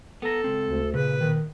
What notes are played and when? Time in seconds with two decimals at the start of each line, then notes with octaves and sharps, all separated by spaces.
0.22 B3 A4 A#5
0.44 C#2 C4
0.64 D2
0.94 A#2 C#3 B4
1.20 D#3